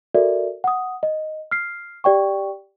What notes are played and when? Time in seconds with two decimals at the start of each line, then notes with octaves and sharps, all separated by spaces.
0.15 F#4 A4 A#4 D5 E5
0.64 F#5 D#6
1.03 D#5
1.51 F6 C7
2.04 G4 D5 G5 C#6